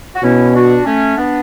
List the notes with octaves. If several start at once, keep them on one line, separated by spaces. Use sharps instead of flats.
F#4
B2 C#4 E4
E4
D4 F#4
A3 C#4
B3 D4